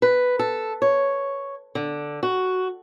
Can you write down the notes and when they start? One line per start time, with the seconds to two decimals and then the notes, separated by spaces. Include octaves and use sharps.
0.02 B4
0.39 A4
0.82 C#5
1.75 D3
2.23 F#4